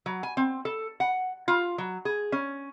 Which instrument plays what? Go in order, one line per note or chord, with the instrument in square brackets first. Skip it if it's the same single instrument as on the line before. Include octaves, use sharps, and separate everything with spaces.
[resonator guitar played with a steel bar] F#3
G#5
C4
A4
F#5
F4
F#3
G#4
C#4